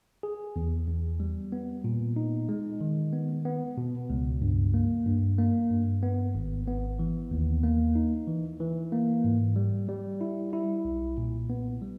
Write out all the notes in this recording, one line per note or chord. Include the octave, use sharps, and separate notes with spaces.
G#4
E2
E2
G3
B3
A#2
D#4
G#3
D#3
B3
B3
B2
C#2
G2
A#3
G2
A#3
G2
B3
G#1
B3
E3
D#2
A#3
D#4
E3
E3
A#3
G#2
G3
G3
E4
E4
B1
A#2
B3
G3